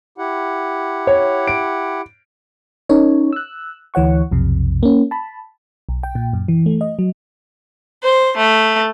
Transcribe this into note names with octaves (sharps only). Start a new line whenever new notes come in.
E4 G4 F#5
C#5
D7
C#4 D#4 A#4 C#5
E6 F#6
D2 E3 C#5 F#5 C#6
B1 F2 C3
A#3 C#4
A5 B5
B1
G5
A#2
F#2
E3
A3
D#5
F#3
C5
A3